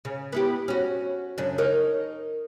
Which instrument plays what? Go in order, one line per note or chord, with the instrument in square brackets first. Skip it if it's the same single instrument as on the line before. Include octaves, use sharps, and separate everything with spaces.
[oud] C#3
B3 E4 G4
C#4 F#4
F#2 C#3 D4
D#4 A#4 C#5